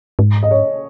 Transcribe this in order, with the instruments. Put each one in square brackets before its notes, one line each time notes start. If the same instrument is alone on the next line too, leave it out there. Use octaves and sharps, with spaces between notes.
[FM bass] G#2
[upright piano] D#5
C#5